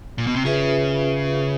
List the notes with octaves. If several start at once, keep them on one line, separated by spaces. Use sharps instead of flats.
A#2
B2
C3
C#3 F4 G#4 B4 E5